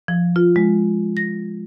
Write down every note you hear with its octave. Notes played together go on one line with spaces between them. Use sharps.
F3
F4
G#3
A#6